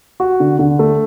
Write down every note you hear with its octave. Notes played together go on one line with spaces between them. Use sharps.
F#4
D3
D3
A3